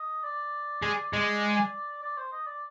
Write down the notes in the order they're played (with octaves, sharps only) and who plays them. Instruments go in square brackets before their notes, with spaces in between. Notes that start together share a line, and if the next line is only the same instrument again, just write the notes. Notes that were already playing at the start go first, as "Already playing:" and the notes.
Already playing: [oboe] D#5
D5
[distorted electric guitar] G#3
G#3
[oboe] D5
C5
D#5
D5